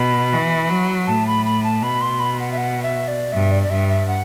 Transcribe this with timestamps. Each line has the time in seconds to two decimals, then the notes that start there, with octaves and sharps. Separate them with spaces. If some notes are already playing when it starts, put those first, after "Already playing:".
Already playing: B2 B5
0.33 E3
0.70 F#3
1.07 A2 A5
1.27 B5
1.46 B5
1.64 A5
1.83 B2 B5
2.01 C6
2.20 B5
2.40 F#5
2.52 E5
2.58 F#5
2.83 E5
3.08 D5
3.32 G2 E5
3.51 D5
3.63 D5
3.70 G2 E5
3.89 E5
4.08 F#5